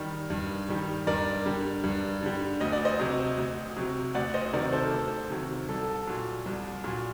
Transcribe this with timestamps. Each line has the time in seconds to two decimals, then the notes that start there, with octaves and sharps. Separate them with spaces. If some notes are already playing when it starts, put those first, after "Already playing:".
Already playing: D#3 G3
0.30 G2
0.69 D#3 G3
1.07 G2 A#4 D5
1.46 D3 G3
1.84 G2
2.23 D3 G3
2.61 D2 D#5
2.72 D5
2.85 C5 D#5
2.99 C3 F#3
3.38 D2
3.76 C3 F#3
4.15 D2 D5 F#5
4.34 C5 D#5
4.53 C3 D#3 F#3 A#4 D5
4.73 A4 C5
4.92 D2
5.30 C3 D#3 F#3
5.69 C2 A4
6.07 A#2 F#3
6.46 C2
6.84 A#2 F#3